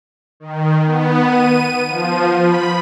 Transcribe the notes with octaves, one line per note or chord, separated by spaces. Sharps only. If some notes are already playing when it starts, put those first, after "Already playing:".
D#3
B3
D#7
F3
B5